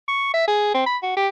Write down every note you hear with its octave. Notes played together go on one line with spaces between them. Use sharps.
C#6
E5
G#4
C4
B5
F#4
G4